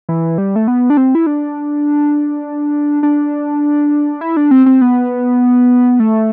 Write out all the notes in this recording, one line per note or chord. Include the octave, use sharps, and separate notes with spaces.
E3
G3
A3
B3
D4
C4
E4
D4
D4
E4
D4
C4
C4
B3
A3